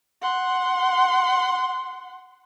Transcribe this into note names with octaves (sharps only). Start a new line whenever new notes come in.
F#5 C6